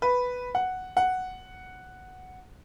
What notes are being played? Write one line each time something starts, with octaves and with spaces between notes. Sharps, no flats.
B4
F#5
F#5